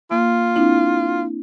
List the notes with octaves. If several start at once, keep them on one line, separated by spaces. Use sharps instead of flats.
A#3 F4
C4 D4 E4